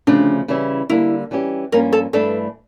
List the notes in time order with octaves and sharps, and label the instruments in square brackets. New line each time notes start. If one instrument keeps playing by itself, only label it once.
[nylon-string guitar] D2 C#3 F3 A3 [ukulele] D4
[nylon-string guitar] C#3 E3 G3 C#4 E4
[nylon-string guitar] D3 G3 A#3 D4 [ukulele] E4
[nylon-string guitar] E3 G3 C#4 G4
[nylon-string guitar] G2 F3 A#3 C#4 [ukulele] A#4
[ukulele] A4
[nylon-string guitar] G2 E3 A3 D4 [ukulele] A4